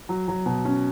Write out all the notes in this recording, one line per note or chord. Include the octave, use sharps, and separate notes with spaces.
F#3
F#3
B2
C#4